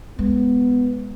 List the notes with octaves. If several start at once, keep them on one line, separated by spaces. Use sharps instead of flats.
G#3 B3